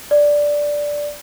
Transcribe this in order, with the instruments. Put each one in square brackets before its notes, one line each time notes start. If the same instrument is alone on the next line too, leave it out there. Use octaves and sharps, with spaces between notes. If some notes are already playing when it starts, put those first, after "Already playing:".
[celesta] D5